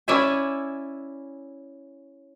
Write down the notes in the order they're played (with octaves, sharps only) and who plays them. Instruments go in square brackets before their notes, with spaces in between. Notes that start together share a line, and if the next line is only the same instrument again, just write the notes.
[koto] C#4 E4 C#5 D5 E5 G#5